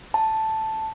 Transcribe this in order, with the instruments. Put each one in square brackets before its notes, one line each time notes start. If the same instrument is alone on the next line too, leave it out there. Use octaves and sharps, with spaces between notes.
[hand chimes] A5